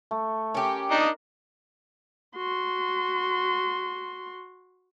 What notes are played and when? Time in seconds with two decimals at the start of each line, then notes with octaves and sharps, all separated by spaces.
0.11 A3
0.55 C#4 G4 A#4
0.91 D4 D#4 D#5
2.36 F#4 C6